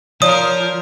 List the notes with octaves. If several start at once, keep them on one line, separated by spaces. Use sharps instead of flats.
F3 F4 A#4 C#5 D5 D#6